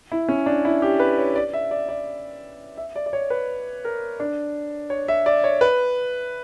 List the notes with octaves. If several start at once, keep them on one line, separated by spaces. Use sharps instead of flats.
E4
C#4
D4
E4
G4
B4
C#5
D5
E5
D5
D5
E5
D5
D5
C#5
B4
A#4
D4
C#5
E5
D5
C#5
B4